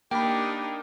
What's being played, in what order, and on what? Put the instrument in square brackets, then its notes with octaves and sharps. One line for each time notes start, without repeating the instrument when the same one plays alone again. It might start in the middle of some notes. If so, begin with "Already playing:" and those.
[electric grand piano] A#3 [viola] D4 D#4 [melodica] G4 [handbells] G5 B5